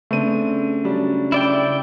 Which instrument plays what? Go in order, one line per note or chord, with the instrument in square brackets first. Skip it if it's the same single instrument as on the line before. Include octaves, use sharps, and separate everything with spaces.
[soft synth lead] C#3 [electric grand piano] A3 D#7 [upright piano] B3 C4 D4
[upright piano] F#3 G3 D4
[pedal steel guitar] E4 D5 G5